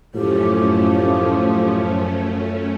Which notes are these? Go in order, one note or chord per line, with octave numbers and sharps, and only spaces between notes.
F#2 A2 F3 A3 C#4 G4